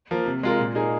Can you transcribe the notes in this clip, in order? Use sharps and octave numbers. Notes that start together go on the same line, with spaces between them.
F3 A#3
C3
G#3 F4 A#4
A#2
A#3 D#4 G#4